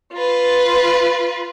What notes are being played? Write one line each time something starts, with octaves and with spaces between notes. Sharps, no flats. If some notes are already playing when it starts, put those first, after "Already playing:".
F4 B4